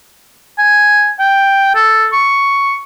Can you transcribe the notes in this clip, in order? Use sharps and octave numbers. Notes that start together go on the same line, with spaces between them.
G#5
G5
A4
C#6